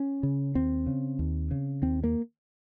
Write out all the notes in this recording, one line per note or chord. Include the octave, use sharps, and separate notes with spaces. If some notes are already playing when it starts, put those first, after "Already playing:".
Already playing: C#4
C#3
D#2 C4
C#3
D#2
C#3
D#2 C4
A#3